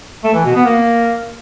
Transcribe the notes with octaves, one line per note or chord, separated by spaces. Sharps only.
A3
E3
B2
B3
A#3